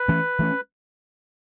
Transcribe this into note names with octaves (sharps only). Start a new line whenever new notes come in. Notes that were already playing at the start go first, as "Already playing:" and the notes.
Already playing: B4
E3 A3 C#4
E3 A3 C#4